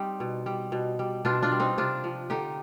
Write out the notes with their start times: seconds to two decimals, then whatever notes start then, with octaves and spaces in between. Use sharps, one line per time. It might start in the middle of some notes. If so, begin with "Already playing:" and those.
Already playing: G3 C4 D#4
0.20 B2
0.46 G3
0.72 B2
0.99 G3
1.25 B2 D4 F4
1.42 D4 F4
1.52 G3
1.60 C4 D#4
1.78 C3 D4 F4
2.04 F3
2.30 D3 D#4 G4